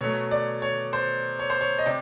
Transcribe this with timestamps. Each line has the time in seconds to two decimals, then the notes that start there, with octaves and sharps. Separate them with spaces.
0.01 B2 F#3 A3 C#5
0.31 D5
0.62 C#5
0.93 C5
1.39 C#5
1.50 C5
1.61 C#5
1.78 D#5
1.86 C3 D5